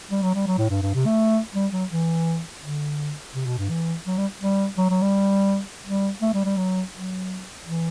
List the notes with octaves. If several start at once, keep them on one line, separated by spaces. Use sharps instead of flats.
G3
F#3
G3
F#3
A2
G2
G2
C3
A3
G3
F#3
E3
D3
C3
B2
G2
E3
F#3
G3
G3
F#3
F#3
G3
G3
A3
G3
G3
F#3
F#3
E3